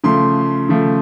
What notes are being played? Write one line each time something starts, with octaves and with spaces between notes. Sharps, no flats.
C#3 F3 A3 C6
C#3 F3 A3